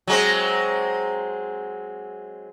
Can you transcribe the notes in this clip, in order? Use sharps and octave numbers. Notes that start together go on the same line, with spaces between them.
F#3 G#3 C4